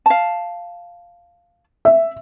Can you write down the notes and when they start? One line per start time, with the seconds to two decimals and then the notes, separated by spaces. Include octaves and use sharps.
0.06 F5 A5
1.85 E5